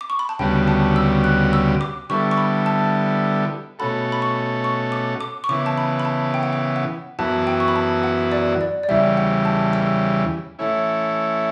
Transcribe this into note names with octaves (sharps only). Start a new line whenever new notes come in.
D6
C#6
B5
A5
D2 C#3 G3 B3 F#4 G5
A5
E6
F#6
E6
D6
D3 G3 B3 E4 A4 C#6
C#6
B5
A5
B2 A3 C#4 F#4 A4 B5
B5
C#6
C#6
D6
D6
C#6
C#3 E3 B3 D6
A5
B5
B5
A5
G5
F#5
G5
F#5
F#2 E3 B3 F#4 A5
G5
C#6
B5
A5
F#5
D5
D5
D5
E2 C#3 E3 G3 E5
F#5
A5
E6
E3 A3 C#4 E4